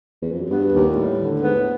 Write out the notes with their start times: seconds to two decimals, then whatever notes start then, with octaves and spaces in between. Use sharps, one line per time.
0.22 E2
0.31 F2
0.40 F#2
0.49 G2 B3
0.72 D#2
0.89 A#2
0.96 A2 G3
1.19 D3
1.42 G#2 B3
1.55 A2